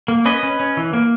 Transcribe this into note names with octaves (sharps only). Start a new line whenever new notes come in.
A#3
C#4 B4 D#5
C#4
C#4
E3
A#3